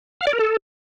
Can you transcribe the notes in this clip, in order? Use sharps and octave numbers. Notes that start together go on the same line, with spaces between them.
F5
D5
A#4
A4